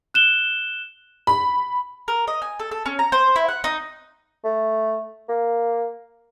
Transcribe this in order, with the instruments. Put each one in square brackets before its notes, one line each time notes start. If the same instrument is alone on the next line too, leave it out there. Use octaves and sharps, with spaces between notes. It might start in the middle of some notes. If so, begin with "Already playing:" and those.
[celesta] F#6 E7 G7
[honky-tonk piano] B5
[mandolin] A#4
D#5
G#5
A4
A4
C#4
A#5
C5
E4
F#5
D#4
[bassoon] A3
A#3